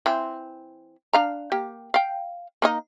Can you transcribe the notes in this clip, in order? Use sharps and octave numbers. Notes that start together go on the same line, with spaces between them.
E3 C4
D4 F5 A#5
A#3 G4
F5 G5
A#3 D#4 D#5